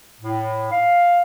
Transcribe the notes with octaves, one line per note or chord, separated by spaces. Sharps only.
A2
F5